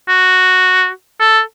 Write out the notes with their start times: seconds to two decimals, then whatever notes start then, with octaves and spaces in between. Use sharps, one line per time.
0.09 F#4
1.20 A4